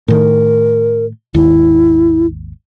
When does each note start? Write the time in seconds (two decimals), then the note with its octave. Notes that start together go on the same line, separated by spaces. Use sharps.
0.08 A2 D#3 A#4
1.34 G#1 D#2 E4